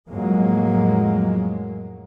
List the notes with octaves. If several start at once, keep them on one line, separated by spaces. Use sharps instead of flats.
F2 A2 F#3 G#3 A#3